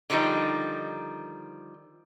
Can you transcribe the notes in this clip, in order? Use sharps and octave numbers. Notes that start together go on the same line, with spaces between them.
D3 D#3 F3 G3 D#4